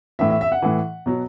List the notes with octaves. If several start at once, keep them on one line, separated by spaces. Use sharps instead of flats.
A2 E3 E5
E5
E5
F#5
A2 E3
B2 F#3